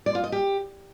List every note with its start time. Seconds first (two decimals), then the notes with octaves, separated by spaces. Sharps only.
0.06 D5
0.15 F4
0.24 D#5
0.32 G4